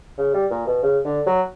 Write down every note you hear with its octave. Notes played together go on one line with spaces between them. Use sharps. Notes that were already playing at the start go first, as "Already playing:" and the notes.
C#3
G3
A#2
B2
C#3
D3
F#3